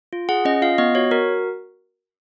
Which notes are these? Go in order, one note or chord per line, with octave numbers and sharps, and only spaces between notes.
F4
G#4 F#5
C#4 D#5
F4 F5
B3 D#5
F#4 C#5
F#4 A#4